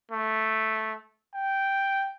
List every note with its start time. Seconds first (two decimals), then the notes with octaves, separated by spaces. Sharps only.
0.11 A3
1.35 G5